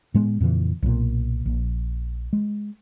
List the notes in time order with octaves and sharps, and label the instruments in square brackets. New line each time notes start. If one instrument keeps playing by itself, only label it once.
[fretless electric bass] A2 G#3 A#3 B3
F2 A#2 C#3 E3
B1 A#2
A#1
G#3